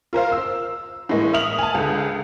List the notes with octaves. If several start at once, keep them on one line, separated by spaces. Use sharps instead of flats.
F4 A#4 C5 F5
E6
A2 E3 G#3 A#3
E5 D#6 F6 F7 F#7
G#5 A5
C#2 D3